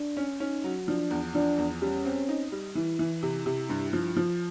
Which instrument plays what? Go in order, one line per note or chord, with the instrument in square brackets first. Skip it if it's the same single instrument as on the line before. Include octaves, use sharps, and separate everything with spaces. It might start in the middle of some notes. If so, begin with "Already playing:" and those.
Already playing: [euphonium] D4
[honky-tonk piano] C#4
[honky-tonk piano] C#4 [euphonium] D#4
[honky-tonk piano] F#3
[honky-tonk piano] F3 [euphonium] D4
[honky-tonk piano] E2
[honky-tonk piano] F3 [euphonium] D4
[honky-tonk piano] E2
[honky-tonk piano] G3 [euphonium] C#4
[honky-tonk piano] C4
D#4
G3
[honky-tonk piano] E3 [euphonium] E4
[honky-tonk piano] E3
[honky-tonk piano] C3 [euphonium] E4
[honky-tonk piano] C3
G2
F3
F3